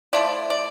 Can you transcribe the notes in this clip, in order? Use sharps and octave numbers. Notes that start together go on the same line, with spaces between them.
F3 A3 E4 D5
D5